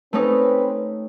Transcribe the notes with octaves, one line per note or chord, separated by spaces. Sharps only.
A3 C4 C#4 D#4 B4